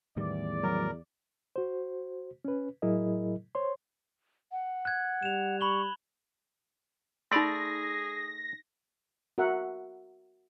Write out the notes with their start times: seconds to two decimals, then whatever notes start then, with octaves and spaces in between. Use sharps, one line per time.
0.17 E2 A2 D#3 G3 D5
0.63 F#3 A#4
1.56 F#4 C5
2.45 C#4 B4
2.82 A2 F#3 E4 G#4 A#4 D#5
3.55 C5 C#5 C6
4.52 F#5
4.85 F#6 G#6
5.23 G3 E7 F7
5.61 B5 C#6 F#7 G7
7.32 A3 D#4 G#4 D5 B5 C6 A#6
9.38 F#4 A#4 E5 F#5